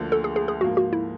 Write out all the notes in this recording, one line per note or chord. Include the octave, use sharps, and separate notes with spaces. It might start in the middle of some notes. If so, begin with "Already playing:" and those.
Already playing: D2 D3 F3 A#3
A4
G#4
G#4
G#4
G#2 F3 A#3 F#4
F#4
E4